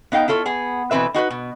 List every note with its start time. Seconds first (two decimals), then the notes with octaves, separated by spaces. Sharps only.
0.12 B3 D#4 F5 G5
0.28 E4 F4 A4 C#5
0.46 B3 G#4
0.91 B2 E3 C4 B4 E5
1.14 D#4 F#4 G#4 B4
1.31 B2